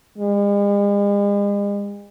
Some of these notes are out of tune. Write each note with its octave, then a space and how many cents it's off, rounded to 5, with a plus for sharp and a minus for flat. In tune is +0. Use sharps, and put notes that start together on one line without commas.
G#3 -45